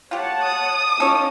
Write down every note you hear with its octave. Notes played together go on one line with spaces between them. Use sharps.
F4 G4 C#5 F#5 A5
D#6
C#4 D#4 F4 A4 C#5